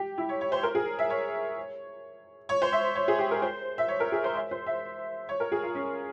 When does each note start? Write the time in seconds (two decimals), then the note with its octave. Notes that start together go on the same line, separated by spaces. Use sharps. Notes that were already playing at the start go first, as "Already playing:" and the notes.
Already playing: G4
0.18 E4
0.29 C#5
0.41 C#5
0.52 C5
0.63 A#4
0.75 G#4
0.99 E5
1.10 C#5
2.49 C#5
2.62 C5
2.72 E5
2.95 C#5
3.08 G#4
3.19 G4
3.31 A#4
3.42 C5
3.78 E5
3.88 C#5
4.00 A#4
4.12 G#4
4.24 C5
4.36 E5
4.51 C5
4.66 E5
5.29 C#5
5.40 A#4
5.52 G#4
5.63 F4
5.75 C#4